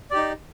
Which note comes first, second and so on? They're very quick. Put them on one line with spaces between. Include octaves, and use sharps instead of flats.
D5 G4 D#4